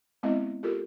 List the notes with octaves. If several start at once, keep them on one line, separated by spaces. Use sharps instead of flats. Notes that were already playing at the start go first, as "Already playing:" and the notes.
G#3 B3 C4 E4 D#5 E5
F4 G4 A4 A#4